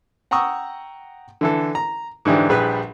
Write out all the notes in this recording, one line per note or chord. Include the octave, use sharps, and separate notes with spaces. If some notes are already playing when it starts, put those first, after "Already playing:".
F#5 G5 A#5 C#6 D#6 E6
D3 E3 A4
A#5
G#2 D3 E3 D4 G4
A#1 G3 G4 G#4 B4 B5